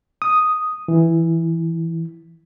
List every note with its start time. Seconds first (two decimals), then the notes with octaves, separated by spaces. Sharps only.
0.22 D#6
0.88 E3